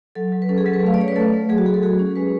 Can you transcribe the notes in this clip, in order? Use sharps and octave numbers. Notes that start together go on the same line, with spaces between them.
F#3 A4
F#3
B4
C#4 A4
G#4
F#3 A4
B4
A3 F5
D5
C#4 C#5
B4
A3 A4
A3
F#3 G#4
F#4
F#3 G#4
A4
F#4 G#4
C#4
G#3 B4